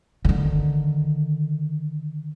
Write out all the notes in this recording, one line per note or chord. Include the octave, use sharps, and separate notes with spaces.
D3 D#3